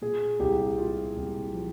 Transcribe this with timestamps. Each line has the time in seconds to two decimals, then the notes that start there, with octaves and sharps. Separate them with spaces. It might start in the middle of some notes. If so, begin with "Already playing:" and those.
0.02 A#2 G#4
0.40 C2 G4
0.77 A#2 F4
1.17 C2
1.54 F3